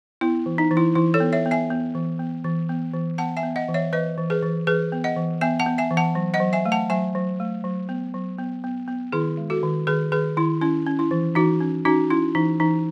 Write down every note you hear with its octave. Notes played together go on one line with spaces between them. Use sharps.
B3 E4
E3
D#4
E3
E4
E3 E4
A4 C#5
B3
C#5 E5
B3
E5 G#5
B3
E3
B3
E3
B3
E3
B3 F#5 A5
E5 G#5
B3
D#5 F#5
E3
C#5 E5
E3 B4 D#5
E3
G#4 B4
E3
E3 G#4 B4
B3
D#5 F#5
E3
B3 E5 G#5
F#5 A5
B3
E5 G#5
E3
F#5 A5
F#3
D#5 F#5
F#3
E5 G#5
A3
F#5 A5
F#3 E5 G#5
F#3
A3
F#3
B3
F#3
B3
B3
B3
D#3 E4 G#4
G#3
F#4 A4
D#3
D#3 G#4 B4
D#3 G#4 B4
D#3 E4
C#4 E4
C#4
E4
E3
E3 D#4 F#4
C#4
C#4 D#4 F#4
C#4 E4
E3 D#4
E3 D#4